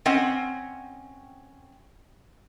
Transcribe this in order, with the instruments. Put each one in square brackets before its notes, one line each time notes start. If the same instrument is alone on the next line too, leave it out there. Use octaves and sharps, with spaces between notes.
[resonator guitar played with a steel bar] C4 C#4 D#5 F#5